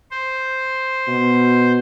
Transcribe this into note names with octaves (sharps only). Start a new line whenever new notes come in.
C5
B2